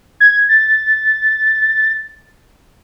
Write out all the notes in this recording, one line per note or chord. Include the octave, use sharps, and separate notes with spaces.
G#6
A6